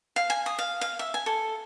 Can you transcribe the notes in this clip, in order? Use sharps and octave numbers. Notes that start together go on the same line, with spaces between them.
F5
G#5
D#6
F5
F5
E5
G#5
A4